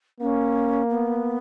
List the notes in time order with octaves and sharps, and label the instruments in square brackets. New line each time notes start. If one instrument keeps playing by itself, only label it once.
[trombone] A#3 [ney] C#4
[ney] B3